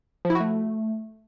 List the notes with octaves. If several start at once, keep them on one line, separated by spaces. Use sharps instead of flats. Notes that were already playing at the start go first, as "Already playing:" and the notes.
F3
E4
F#4
A3